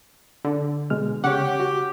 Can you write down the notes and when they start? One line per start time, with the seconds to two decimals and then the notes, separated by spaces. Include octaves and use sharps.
0.45 D3
0.90 B2 G#3 F6
1.24 C#3 G4 C#5 F#5
1.60 F#4